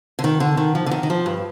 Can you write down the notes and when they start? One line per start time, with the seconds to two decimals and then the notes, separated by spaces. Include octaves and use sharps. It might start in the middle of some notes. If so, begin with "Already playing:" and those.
0.19 D3
0.24 D#3
0.40 D3
0.57 D#3
0.75 F3
0.86 D3
0.91 D#3
1.03 D#3
1.10 F3
1.26 G2